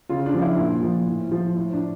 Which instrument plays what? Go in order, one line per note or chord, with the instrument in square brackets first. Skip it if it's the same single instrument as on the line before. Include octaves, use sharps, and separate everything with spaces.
[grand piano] C#3 F4
D4
F3
E4
A#2
F3
A2
F3
A2
D4